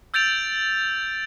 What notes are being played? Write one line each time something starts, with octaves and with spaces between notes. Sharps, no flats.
E6 G6 A6 D7 F7